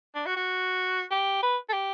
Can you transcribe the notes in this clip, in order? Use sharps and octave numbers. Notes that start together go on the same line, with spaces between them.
D4
F#4
F#4
G4
B4
A4
G4